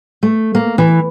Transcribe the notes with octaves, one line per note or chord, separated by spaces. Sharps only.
A3
A#3
E3